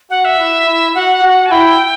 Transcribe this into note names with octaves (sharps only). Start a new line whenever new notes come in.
F#4 F#5
E5
E4
E4
F#4 F#5
F#4
A5
E4 G5